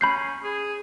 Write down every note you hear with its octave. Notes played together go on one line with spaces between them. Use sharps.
C#4 B5 G6 C7
G#4